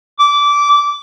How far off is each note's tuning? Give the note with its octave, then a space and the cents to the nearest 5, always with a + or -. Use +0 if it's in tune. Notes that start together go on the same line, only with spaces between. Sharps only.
D6 -15